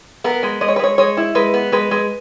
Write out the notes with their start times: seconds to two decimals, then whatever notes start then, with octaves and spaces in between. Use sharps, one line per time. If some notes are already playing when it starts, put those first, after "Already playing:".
0.24 B3 A#4
0.43 G#3
0.61 G#3 D#5
0.68 C#5
0.76 B4
0.79 G#3 C#5
0.98 G#3 C#5
1.17 E4
1.35 G#3 B4
1.54 B3
1.72 G#3 B4
1.91 G#3